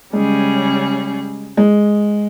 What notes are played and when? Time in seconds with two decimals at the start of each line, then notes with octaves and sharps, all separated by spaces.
0.13 C#3 G3 G#3 C#4 G#4
1.57 G#3